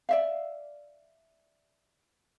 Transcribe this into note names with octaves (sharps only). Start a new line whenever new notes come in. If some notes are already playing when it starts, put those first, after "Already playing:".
D5 E5 F5